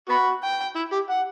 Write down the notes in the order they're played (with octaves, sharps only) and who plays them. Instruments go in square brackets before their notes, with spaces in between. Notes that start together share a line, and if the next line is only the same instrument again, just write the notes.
[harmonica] B3 F#4 [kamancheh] B5
[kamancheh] G5
[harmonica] E4
G4
F#5